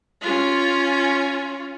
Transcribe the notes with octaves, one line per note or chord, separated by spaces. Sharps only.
C#4 F4